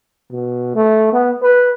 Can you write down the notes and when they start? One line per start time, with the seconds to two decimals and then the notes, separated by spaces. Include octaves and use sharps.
0.32 B2
0.75 A3
1.13 B3
1.42 B4